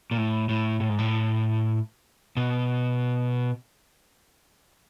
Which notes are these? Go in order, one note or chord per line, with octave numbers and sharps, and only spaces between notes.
A#2
A2
A2
A2
G#2
A2
B2